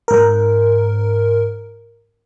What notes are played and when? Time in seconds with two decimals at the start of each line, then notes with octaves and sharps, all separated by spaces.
0.08 G#2 A#4